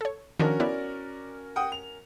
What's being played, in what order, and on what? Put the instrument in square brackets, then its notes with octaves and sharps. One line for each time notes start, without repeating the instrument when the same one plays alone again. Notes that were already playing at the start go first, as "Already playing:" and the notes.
[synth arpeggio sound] A4 C#5
[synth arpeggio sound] D#3 F3 D4 [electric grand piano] C#4 F#4 A#4
[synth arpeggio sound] B3 E4 [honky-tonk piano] D5
[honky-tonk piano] F#5 G5 D#6
F7